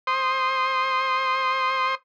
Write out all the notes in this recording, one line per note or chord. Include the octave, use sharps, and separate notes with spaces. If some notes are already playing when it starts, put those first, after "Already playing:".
C5 C6 D#6